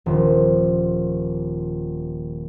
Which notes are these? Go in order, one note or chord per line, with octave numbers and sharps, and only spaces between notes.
D#1 F3